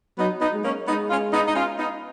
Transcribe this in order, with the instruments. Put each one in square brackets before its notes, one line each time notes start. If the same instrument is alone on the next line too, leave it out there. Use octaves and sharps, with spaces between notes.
[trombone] F#3 [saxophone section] B3 D#4
[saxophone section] B3 D#4
[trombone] G#3
[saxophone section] A#3 C#4
[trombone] G#3 [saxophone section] B3 D#4
[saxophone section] C#4 F4
B3 D#4
D#4
C#4 F4
B3 D#4